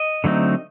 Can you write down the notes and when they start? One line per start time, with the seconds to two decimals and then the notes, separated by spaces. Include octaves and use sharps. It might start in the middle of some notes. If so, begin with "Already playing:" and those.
Already playing: D#5
0.24 D3 F#3 A3 C4 D#4